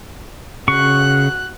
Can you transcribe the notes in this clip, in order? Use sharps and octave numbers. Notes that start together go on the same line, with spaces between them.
C#3 F#4 C#6 F#6